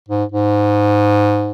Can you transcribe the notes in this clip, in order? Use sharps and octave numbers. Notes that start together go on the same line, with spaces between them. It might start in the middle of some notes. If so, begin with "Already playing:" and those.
G#2
G#2